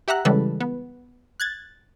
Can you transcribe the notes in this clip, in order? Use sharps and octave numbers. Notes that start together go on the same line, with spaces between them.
G4 E5 F#5 A#5 F#6
C#3 E3 G3 G#3 A4 B4
B3
F#6 G#6 A6